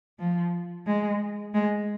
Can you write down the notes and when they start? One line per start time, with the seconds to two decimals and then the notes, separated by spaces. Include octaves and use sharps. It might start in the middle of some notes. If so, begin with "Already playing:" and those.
0.19 F3
0.87 G#3
1.54 G#3